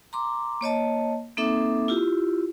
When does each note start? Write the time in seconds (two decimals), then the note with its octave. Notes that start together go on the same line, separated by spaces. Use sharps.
0.13 A#5 C6 D6
0.61 A#3 C#5 D#5 A5
1.37 A#3 C4 D#4 A4 E5 D6
1.88 E4 F4 G4